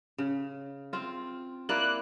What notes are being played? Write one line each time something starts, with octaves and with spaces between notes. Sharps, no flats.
C#3
C4 F4
A#3 E4 D5 F#6